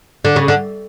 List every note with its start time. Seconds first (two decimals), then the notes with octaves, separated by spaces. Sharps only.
0.25 D3
0.36 C#3
0.48 D3